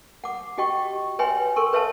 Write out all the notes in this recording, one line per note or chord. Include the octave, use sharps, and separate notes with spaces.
F#5 D6
F#4 G4 D#5 G5 C#6
B4 C#5 E5 G5 G#5 C6
A4 A#4 C6 C#6
B4 C#5 E5 F5 A5